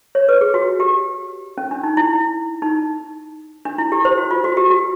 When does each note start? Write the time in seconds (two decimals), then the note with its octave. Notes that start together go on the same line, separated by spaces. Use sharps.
0.15 C#5
0.29 B4
0.41 G#4
0.54 F#4
0.80 G4
1.58 C#4
1.71 D4
1.84 D#4
1.97 E4
2.62 D#4
3.65 D4
3.78 E4
3.92 G4
4.05 C5
4.18 F#4
4.31 F4
4.44 F#4
4.57 G4
4.70 F#4